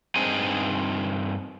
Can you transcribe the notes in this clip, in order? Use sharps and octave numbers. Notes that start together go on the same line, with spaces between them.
G2 C4 D#4 G#4 C5 D#5